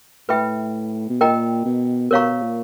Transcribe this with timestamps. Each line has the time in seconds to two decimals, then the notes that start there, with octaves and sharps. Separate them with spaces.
0.29 A2 B4 E5 G5 B5
1.10 B2
1.20 A#2 A#4 D#5 G5 A#5
1.65 B2
2.11 B2 A#4 C#5 F5 A#5 C#6
2.42 A#2